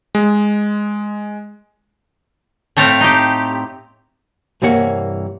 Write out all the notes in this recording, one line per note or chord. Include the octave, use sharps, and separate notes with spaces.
G#3
A2 A3 C4 F5 A5
D#4 G4
C2 G2 E3 A#3 C#5 F#5